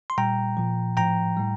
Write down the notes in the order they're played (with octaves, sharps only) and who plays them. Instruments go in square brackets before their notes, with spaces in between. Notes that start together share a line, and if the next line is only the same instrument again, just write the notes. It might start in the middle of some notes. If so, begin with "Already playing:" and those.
[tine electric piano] C6
A#2 G3 G5 A#5
A#2 F3
A2 F3 G5 A#5
A2 G3